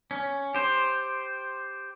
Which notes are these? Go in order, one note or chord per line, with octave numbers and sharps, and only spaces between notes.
C#4
G4 C5